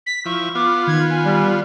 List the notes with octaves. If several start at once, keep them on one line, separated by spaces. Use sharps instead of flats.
B6
F3 E4 C#6
B3 F4 D6
D#3 G#6
G#5
G3